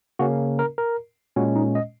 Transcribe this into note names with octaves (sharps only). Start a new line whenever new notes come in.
C#3 A#3 C#4 F#4
A#4
A#4
A#2 G#3 C#4 F#4
D#4
D#5